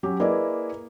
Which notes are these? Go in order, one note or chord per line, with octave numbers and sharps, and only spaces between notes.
F#3 C#4 G4
A#3 E4 G#4 B4 D5 D#5